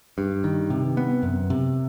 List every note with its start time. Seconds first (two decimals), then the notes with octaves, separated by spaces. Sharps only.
0.18 G2
0.44 D#3
0.70 C3
0.97 B3
1.23 F#2
1.50 C3